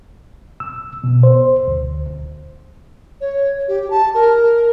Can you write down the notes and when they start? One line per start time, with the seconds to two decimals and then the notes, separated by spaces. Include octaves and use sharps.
0.60 E6
1.04 B2
1.23 C5
1.68 D2
3.21 C#5
3.68 G4
3.90 A5
4.14 A#4